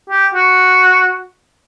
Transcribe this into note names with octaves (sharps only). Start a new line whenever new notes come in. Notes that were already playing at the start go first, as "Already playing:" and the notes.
G4
F#4